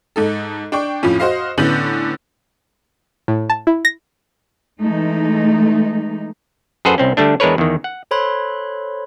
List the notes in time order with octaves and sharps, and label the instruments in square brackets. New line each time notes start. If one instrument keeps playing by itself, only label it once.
[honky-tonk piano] G#2 D#4 A4
D4 G5 C#6
F2 A2 F3 C#4
F#4 C5 D#5 F5
A2 D3 B3 C#4 G6 F#7
[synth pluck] A2
A5
E4
A#6
[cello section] E3 G#3 A3 D#4
[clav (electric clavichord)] F#2 G#4 A4 B4 C5 F#5
C2 C4 C#4
D3 G3 A3 D4
E2 G#3 D4 A#4 B4 C#5
E2 D#3
F#5
[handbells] A4 C5 C#5 B5 C6 F#6